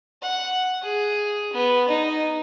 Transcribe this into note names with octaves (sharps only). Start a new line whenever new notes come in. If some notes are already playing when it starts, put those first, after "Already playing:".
F#5
G#4
B3
D#4